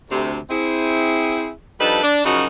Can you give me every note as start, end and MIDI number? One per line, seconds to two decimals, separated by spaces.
0.10 0.37 38
0.10 0.37 48
0.50 1.51 60
0.50 1.51 64
0.50 1.51 68
1.80 1.99 53
1.80 1.99 55
1.80 1.99 62
1.80 1.99 63
1.80 1.99 69
1.80 1.99 71
2.03 2.21 62
2.25 2.46 42
2.25 2.46 49
2.25 2.46 53
2.25 2.46 54
2.25 2.46 63
2.25 2.46 66